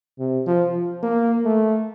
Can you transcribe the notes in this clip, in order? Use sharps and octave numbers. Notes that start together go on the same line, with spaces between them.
C3
F3
A#3
A3